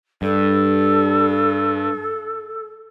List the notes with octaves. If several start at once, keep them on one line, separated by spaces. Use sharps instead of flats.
G2 A4